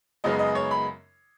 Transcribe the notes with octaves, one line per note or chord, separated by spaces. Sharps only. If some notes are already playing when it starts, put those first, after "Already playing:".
F#2 C#3 G#3 B3 D#4 D#5
D#5
C#5
B5